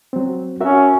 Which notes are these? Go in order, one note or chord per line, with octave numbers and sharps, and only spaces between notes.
F#3 C4
C#4 F#4 A#4 E5